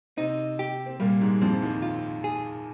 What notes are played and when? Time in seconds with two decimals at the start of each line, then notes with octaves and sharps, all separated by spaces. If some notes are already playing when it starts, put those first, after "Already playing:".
0.17 C3 C4 D#4
0.59 G4
0.86 C4
1.00 A#2 G3 A#3
1.21 G#2 G#3
1.41 F2 F3 C4
1.62 D#2 D#3
1.82 F4
2.24 G#4